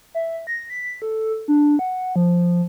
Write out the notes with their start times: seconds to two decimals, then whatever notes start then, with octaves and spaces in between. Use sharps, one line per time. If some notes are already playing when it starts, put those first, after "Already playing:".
0.15 E5
0.47 A#6
0.70 B6
1.02 A4
1.48 D4
1.79 F#5
2.16 F3